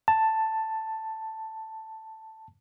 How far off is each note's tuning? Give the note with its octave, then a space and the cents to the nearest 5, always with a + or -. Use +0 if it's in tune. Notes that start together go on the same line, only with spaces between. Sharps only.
A5 +5